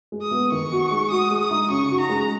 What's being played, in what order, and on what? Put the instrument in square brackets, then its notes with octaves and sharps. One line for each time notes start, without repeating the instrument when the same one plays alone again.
[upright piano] G#3
[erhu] D#6
[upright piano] B3
[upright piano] D#3 [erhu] C#6
[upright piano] F#4
G#3
[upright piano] F#4 [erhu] D#6
[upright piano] G#3
[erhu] D#6
[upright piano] D#4
[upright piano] C#3 [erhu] C#6
[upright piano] F#4
[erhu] A#5
[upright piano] G#3